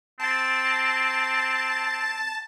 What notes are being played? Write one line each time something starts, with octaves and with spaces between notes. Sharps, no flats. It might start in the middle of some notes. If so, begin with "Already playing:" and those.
C4 A5 A6